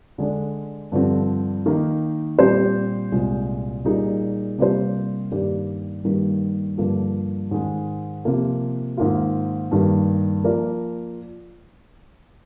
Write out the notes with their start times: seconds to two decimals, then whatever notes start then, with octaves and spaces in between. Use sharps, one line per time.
0.18 D3 G#3 D4
0.92 G2 D3 F3 C4
1.66 D#3 A#3 D#4
2.39 A#2 G3 C4 G4 C5
3.12 C2 A#2 G#3
3.84 A#2 G3 A#3 D#4 G#4
4.58 C3 G3 A#3 F4 C5
5.31 G2 D#3 G3 A#3 D4
6.04 G2 D#3 G3 A#3 D#4
6.78 G2 D3 F3 A#3
7.51 G#2 D#3 G#3
8.25 C3 F3 A#3
8.97 G#2 D#3 A#3 F4
9.72 G2 D#3 A#3
10.44 F3 A#3 F4 A#4 D5